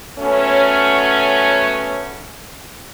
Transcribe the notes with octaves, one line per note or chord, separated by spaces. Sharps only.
F#3 A3 B3 C#4